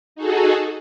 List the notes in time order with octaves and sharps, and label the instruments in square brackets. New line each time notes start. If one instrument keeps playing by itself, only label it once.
[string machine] D#4 F#4 G#4 A4